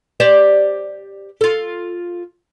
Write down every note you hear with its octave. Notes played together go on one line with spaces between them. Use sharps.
G4 C5 D5
F4 A4